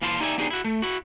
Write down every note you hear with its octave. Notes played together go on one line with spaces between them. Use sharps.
A#2 E3 F5 A5 A#5 C6
D#4 G4 D5 E5 F#5 G#5
B3 D4 D#4 G4 G#4
E4 F#4
A3
E4 F#4